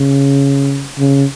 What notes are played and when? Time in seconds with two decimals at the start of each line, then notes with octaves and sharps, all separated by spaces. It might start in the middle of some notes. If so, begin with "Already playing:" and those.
Already playing: C#3
0.98 C#3